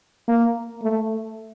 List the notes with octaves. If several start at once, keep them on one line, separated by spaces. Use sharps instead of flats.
A#3
A3